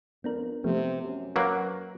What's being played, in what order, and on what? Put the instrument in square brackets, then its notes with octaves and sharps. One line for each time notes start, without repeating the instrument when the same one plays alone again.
[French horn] F2 [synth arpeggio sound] B3 D4 A#4
[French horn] C3 [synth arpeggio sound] F3 A3 B3
[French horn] F#2
[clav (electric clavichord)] F#3 A#3 [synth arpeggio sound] B4 F#6